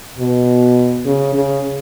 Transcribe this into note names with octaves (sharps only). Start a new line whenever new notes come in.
B2
C#3
C#3